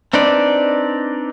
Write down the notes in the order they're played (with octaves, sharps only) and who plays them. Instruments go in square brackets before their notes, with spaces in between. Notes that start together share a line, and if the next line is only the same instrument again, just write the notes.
[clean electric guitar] C4 D4 D#4 B4 D5